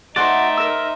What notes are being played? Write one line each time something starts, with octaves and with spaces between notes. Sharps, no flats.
A3 D#4 F#4 C5 D5 E5 F#5 C6
A#4 E6